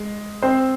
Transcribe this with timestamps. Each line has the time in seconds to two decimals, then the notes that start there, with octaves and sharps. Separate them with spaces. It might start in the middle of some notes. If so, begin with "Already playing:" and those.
Already playing: G#3
0.43 C4 C5